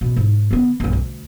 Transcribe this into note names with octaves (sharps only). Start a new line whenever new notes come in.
B2
G#2
D3 B3
B1 G2
D2